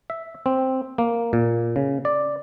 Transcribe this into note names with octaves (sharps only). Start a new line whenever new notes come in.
E5
C4
A#3
A#2
C#3
D5